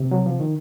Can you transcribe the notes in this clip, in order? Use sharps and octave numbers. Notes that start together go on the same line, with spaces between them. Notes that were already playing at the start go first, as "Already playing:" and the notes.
Already playing: C3
F#3
F3
D#3